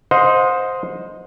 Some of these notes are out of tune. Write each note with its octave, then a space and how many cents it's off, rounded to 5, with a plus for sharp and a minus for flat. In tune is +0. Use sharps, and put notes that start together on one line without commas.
C5 +0 D#5 +5 F#5 -45